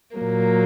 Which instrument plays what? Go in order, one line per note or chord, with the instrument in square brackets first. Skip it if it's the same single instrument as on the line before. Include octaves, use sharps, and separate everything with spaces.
[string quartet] A#2 F#3 A#3